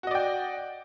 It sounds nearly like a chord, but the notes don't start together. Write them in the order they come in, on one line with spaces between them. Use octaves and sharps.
F#4 D#5 D5 G5